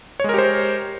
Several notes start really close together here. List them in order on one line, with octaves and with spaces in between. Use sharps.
C#5 G#3 A#4 G4 C5